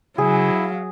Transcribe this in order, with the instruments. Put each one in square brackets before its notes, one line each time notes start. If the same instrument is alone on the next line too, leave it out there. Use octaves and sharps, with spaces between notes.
[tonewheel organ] C#3 G#5 [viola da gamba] F#3 [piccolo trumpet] E4 [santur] G#4
[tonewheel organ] F5